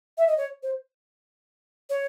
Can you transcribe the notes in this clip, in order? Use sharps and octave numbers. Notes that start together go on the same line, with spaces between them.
E5
D#5
C#5
C5
C#5